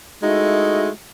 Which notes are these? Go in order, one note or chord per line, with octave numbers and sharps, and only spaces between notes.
G#3 A3 D#4 E4 F#4